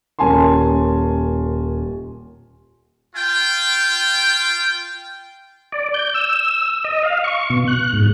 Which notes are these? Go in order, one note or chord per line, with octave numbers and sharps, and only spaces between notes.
D#1 C#4 A#4 G#5 A5 C6
F4 G5
D5
G6
E6
D#5
F5
C#6
B2
F#6
G#2